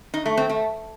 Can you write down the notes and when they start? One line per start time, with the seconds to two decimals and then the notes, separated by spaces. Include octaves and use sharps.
0.14 D#4
0.26 A3
0.38 C4
0.49 A3